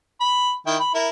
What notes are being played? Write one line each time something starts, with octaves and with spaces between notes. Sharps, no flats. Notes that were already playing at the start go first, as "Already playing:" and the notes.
B5
D#3 E4 G5
B5
E4 A#4